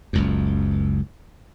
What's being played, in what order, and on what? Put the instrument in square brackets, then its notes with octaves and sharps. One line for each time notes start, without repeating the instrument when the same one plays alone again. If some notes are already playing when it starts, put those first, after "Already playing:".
[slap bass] F#1 C#2 F#2